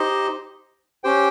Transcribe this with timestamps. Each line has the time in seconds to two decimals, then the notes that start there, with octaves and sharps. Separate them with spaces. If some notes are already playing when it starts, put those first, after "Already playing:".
Already playing: D#4 G4 C5 D#5
1.04 C#4 G4 C5 G5